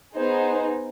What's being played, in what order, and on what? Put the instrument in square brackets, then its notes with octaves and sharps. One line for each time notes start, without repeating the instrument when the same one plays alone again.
[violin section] B3 D#4 G#4 C5